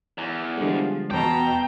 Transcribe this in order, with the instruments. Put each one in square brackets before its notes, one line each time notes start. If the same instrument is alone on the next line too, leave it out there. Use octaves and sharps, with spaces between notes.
[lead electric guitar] E2
[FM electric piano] D3 G3 G#3 [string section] F3
[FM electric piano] E2 [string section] B2 [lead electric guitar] G5 [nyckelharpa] A5 A#5